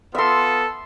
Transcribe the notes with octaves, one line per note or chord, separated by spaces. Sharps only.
B3 F4 A4 E5 C6